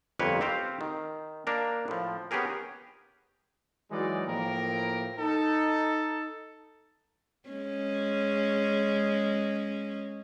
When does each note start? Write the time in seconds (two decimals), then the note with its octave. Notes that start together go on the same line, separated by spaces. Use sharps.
0.19 G1 F2 A#3 B4 C#5 G5
0.41 C4 G4 C5 F5
0.81 D#3
1.47 A#3 D4 A#4
1.88 A2 F3
2.31 B3 C#4 G4 G#4 A#4
3.91 E3 F#3 G#3 D#4 D5
4.26 A2 F3 A#3 A#4 G5
5.19 D#4 A4
7.49 G#3 C#4